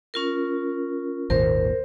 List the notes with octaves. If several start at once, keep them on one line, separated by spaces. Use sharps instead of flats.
C#4 F4 A#4
G#1 D#2 A#2 A#4 C5